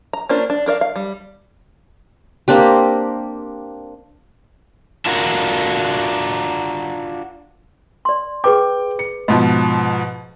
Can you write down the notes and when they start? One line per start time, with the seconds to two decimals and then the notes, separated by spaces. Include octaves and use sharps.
0.13 A#5
0.29 A#3 C#4 D4 F4 C5
0.50 D4
0.66 D4 A#4 D5 F5
0.81 F5
0.96 G3
2.48 A#3 C4 D4 G4
5.06 D4 F4 F#4 A#4
8.05 D5 C6
8.44 G#4 B4 G5 D6
8.99 C#7
9.28 G#2 B2 F3 D#5